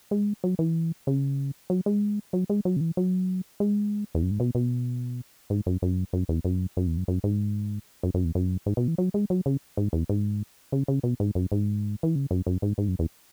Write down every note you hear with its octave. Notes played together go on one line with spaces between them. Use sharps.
G#3
F#3
E3
C#3
F#3
G#3
F#3
G#3
F#3
C#3
E3
F#3
G#3
E2
F#2
G#2
B2
B2
G#2
F#2
F#2
F#2
E2
F#2
F#2
E2
F#2
F#2
G#2
F#2
F#2
E2
F#2
G#2
B2
E3
F#3
G#3
F#3
C#3
G#2
E2
G#2
C#3
C#3
B2
G#2
F#2
G#2
E3
C#3
F#2
F#2
G#2
G#2
F#2
E2